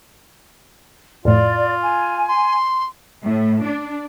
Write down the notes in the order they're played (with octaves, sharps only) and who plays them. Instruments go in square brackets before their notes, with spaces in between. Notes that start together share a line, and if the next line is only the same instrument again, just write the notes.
[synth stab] F2 A2 [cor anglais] F4 [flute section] D5
[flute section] G#5
[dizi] C6
[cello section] A2
D4